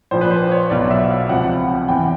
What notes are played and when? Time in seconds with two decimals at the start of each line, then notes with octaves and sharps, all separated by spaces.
0.11 A#1 A#2 F3 C5
0.21 B4
0.31 C5
0.51 C#5
0.70 B1 B2 F#3 D5
0.91 E5
1.10 F5
1.29 C#2 C3 F3 F#5
1.88 E2 C3 E3 G5